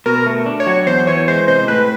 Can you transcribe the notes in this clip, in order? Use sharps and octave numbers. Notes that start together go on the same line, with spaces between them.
B2 A#4
A3
D4
C#5
F#3
E2 C5
E3 C#5
G#3 C5
C3 C5
A2 B4